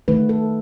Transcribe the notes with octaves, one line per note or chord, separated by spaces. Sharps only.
D#3 A3 B4
A4